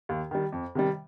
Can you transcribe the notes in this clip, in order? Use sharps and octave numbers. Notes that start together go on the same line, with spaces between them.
D#2
D#3 G3
F2
C3 D#3 G3